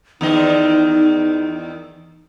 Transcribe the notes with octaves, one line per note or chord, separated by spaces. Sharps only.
E2 D#3 D#4 D#5